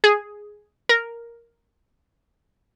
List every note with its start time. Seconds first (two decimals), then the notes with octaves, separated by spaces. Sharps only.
0.04 G#4
0.89 A#4